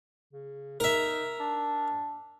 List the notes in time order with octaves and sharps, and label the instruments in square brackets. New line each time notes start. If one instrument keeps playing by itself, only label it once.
[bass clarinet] C#3
[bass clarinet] D#4 [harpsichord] A#4 E5
[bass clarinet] D4